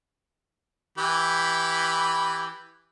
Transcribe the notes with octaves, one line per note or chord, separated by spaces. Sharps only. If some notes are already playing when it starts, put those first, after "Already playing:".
E3 G4 B5